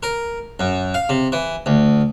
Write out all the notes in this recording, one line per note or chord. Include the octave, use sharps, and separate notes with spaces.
A#4
F#2
F5
C3
E3
D2